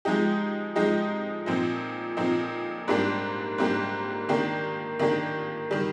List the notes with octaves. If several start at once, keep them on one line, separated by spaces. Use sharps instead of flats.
F3 G#3 D#4 G4
F3 G#3 D#4 G4
A#2 F3 C4 D#4
A#2 F3 C4 D#4
G#2 G3 A#3 D4 G4
G#2 G3 A#3 D4 G4
D#3 A#3 D4 G4
D#3 A#3 D4 G4
D#3 G3